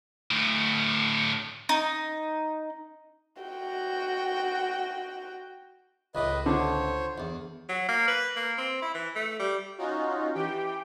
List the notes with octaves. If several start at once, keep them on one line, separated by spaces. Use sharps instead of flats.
D2 A2
D#4
F#4 G5
C#2 A2 B4 D#5
D3 C5 C#5
E2
F#3
A#3
B4
A#3
C4
E4
E3
A3
G3
C#4 D#4 F4 F#4
E3 G4 G5